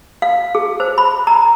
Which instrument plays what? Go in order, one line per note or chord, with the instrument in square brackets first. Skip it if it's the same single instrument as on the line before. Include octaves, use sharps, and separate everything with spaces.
[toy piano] F5
G#4
C5
B5
A#5